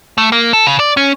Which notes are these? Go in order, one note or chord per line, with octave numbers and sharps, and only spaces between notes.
A3
A#3
A4
C#3
D5
C#4